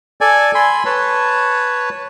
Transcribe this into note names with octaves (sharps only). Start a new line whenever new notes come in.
A4 D5 G#5
G#5 B5 C6
B4 C#5 A5